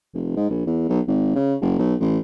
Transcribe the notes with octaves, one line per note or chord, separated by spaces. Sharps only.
F1
G#2
A#1
E2
B1
G#1
C#3
F#1
B1
A1